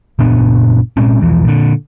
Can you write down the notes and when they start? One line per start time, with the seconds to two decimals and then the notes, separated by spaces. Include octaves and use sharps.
0.19 F#1 A#2 B3 D4
0.97 A#2 G#3 C4 C#4
1.21 B1 E2 E3 F3
1.45 A#2 D3